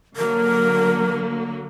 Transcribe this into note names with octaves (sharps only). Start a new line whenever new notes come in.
D3 F#3 A#3 A#4